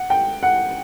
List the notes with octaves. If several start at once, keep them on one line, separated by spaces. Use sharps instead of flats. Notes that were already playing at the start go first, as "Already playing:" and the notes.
Already playing: F#5
G5
F#5